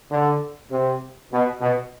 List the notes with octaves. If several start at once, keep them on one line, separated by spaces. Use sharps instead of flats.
D3
C3
B2
B2